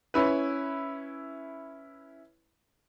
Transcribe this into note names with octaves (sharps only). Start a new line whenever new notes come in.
C#4 E4 B4